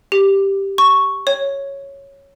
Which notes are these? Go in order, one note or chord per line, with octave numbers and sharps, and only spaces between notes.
G4
C#6
C#5